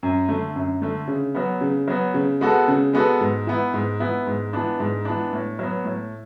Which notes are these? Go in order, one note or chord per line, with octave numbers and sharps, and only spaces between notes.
F#2
D3 A3
F#2
D3 A3
C#3
F#3 B3
C#3
F#3 B3
C#3
G#3 B3 F#4 A4
C#3
G#3 B3 F#4 A4
G#2
E3 B3 E4
G#2
E3 B3 E4
G#2
E3 B3 D4
G#2
E3 B3 D4
A2
F#3 B3
A2